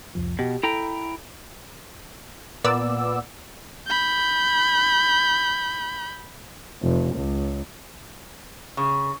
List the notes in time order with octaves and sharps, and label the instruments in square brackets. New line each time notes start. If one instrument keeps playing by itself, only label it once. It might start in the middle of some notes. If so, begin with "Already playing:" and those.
[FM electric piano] C2 F2 F3
[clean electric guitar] B2 [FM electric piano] G4
[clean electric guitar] E4 G5 A#5 [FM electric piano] A4
[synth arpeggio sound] A#2 B3 D5 E6
[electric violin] B5 G6
[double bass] F1
C#2
[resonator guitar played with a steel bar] C#3